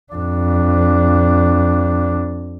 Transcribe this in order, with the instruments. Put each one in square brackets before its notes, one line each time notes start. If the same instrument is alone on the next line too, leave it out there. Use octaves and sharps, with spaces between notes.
[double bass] F2 D4